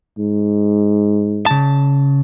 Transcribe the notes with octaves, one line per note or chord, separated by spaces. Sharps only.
G#2
C#3 A5